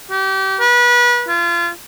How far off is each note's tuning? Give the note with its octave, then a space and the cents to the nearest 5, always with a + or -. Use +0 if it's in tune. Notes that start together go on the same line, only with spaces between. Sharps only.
G4 -30
B4 -30
F4 -30